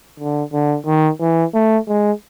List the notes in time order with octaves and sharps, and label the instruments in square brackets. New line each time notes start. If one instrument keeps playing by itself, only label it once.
[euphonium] D3
D3
D#3
E3
A3
G#3